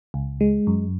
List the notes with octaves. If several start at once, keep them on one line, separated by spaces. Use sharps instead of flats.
C#2
G#3
F#2